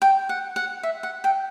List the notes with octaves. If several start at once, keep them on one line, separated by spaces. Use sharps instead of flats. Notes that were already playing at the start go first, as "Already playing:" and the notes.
G5
F#5
F#5
E5
F#5
G5